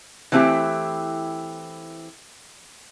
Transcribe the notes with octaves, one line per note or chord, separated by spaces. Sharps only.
E3 A3 C4 E4 G4